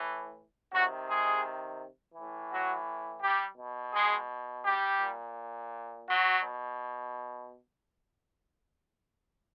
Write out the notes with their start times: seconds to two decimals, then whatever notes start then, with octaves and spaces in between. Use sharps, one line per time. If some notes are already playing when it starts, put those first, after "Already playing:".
Already playing: A2 E3
0.72 C3 D#3 F#3 F#4
1.07 G#3 G#4
2.14 A2 E3
2.51 F#3 F#4
3.21 G3 G4
3.57 B2
3.93 G#3 G#4
4.64 G3 G4
5.00 A#2
6.07 F#3 F#4
6.43 B2